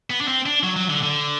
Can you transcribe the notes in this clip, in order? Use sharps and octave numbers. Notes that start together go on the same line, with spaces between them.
B3
D4
C4
D4
F#3
F#3
D3
D3